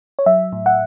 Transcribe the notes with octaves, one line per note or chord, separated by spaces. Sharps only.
C#5
F#3 E5
A2
F#5